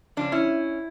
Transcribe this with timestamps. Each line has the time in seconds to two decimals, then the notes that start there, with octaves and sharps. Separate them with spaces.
0.17 C#3 F3 C#4 D4
0.32 C#4 E4